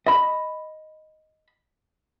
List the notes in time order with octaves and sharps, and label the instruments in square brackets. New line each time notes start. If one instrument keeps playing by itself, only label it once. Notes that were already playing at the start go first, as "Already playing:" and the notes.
[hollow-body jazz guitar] D#5 B5